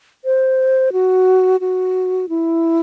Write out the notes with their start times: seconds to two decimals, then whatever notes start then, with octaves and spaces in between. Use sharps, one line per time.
0.25 C5
0.93 F#4
1.61 F#4
2.29 E4